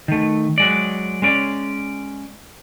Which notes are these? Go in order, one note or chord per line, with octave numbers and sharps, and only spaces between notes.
D#3 A3
F#3 G#3 D5
G#3 C#4 D5